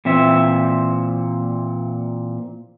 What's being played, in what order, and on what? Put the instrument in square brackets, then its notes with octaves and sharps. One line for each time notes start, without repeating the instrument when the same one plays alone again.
[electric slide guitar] A#2 E3 C4 E5